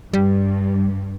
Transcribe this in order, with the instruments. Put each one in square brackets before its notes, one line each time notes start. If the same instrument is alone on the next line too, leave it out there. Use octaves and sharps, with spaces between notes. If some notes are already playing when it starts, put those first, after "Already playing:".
[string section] G2 [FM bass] G3